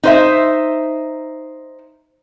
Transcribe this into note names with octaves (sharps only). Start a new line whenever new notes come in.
D#4 C5 E5